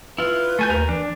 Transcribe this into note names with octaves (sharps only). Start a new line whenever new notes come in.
E4 F4 B4
A3 G#5 G6
D#2 A#4
E3 D4